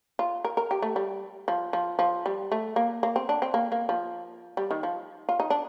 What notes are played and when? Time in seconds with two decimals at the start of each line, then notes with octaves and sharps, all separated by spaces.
0.19 F4
0.45 A#4
0.57 A#4
0.71 G4
0.82 A3
0.96 G3
1.48 F3
1.73 F3
1.99 F3
2.26 G3
2.52 A3
2.76 A#3
3.03 A#3
3.16 C4
3.29 D4
3.42 C4
3.54 A#3
3.72 A#3
3.89 F3
4.57 G3
4.71 D#3
4.83 F3
5.29 F4
5.40 D#4
5.50 D4